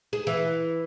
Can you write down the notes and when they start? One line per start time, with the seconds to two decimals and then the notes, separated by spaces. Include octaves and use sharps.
0.13 G#4
0.27 E3